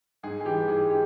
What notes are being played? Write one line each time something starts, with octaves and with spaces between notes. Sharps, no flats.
G#2 G#4
G#4
E3 G4
G#2 G#4
G4